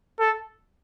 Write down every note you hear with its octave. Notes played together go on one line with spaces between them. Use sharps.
A4